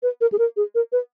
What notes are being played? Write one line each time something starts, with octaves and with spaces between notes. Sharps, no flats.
B4
A#4
G#4
A#4
G#4
A#4
B4